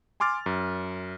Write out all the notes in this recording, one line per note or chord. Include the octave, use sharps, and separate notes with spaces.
G#5 C6 D6 F6 A6
F#2